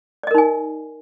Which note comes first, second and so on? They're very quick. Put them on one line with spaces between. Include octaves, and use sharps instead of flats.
D5 D#5 A#4 D#4 G#5